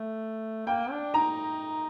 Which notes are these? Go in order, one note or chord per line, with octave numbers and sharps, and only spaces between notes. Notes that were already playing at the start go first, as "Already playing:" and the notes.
Already playing: A3
A#3 G5
D4
D#4 A#5